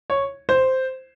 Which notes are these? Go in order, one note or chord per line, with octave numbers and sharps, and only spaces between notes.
C#5
C5